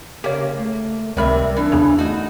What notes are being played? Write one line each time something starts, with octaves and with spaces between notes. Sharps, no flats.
C#3 A#3 G4 C#5
A3
C#2 C3 D#3 G3 A#4 E5 F6
E3 D4
E2 C#3 C#5
A3 D#4 F#4